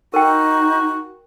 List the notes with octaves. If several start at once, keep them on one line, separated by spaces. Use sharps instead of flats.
D#4 F#4 A#4 G5